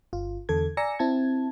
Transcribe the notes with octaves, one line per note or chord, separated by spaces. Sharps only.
G1 F4
E2 D3 A4 G#6
D5 G#5 A#5 E6 A#6 C#7
C4 E4 A5 G#6